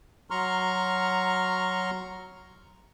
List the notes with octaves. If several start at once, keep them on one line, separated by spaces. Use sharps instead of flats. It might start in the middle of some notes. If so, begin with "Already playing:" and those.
F#3 A#5 C6 C#6 F6